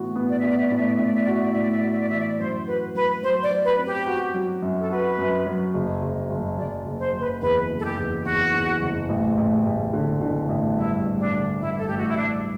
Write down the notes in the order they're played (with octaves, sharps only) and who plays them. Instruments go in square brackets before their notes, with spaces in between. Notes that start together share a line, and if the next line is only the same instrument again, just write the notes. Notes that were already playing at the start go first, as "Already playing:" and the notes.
Already playing: [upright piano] A2 E3 B3 F#4
B3
[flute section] D5
[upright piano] B3 [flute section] E5
[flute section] D5
E5
[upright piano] A2 [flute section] D5
[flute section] E5
D5
[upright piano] A2 [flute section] E5
[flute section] D5
E5
[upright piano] F#4 [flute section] D5
[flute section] E5
D5
[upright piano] A2 [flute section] E5
[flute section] D5
E5
[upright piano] F#4 [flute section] D5
[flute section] E5
D5
[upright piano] E3 [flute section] E5
[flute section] D5
[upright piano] F#2 [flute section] C5
[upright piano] F#4 [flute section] B4
[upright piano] F#3 [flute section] B4
[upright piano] F#3 [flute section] C5
[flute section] D5
[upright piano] F#3
[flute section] B4
[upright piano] C4
[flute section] G4
[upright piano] F#4
F#3
F#2
[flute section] A4
[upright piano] F#4 [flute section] B4
[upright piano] F#2
F#3
F#1
F#1
F#1
[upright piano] F#1 [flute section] D5
[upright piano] F#1
[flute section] C5
[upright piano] F#1
[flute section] B4
[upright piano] E2 [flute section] B4
[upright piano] F#1
[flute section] A4
G4
[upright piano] E2
[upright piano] E2 [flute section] F#4
[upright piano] E2
F#1
A1
A1
A1
D3
D3
A1
[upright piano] G2 [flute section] E4
[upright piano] A1
[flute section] D4
[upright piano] D3
[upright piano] G2 [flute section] E4
[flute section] A4
[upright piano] A1 [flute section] G4
[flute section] F#4
E4
[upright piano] G2 [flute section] D4